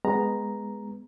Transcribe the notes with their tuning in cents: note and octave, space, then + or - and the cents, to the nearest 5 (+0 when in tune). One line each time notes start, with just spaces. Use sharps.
G#3 +0 B3 +0 A#5 +0